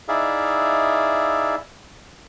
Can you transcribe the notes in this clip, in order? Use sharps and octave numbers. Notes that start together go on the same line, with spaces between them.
D#4 E4 G#4 D5 E5 F5